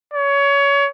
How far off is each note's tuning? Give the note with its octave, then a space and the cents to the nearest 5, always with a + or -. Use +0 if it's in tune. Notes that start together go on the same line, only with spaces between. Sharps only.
C#5 +25